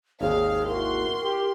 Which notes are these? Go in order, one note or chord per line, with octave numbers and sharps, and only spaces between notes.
G#1 D#2 G#4 F5
E4 F#4 A#4 C6
G4